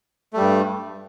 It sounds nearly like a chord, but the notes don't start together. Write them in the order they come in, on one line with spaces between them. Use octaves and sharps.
A3 G3 G2